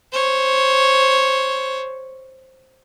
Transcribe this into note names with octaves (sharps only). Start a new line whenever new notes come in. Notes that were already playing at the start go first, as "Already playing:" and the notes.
C5 C#5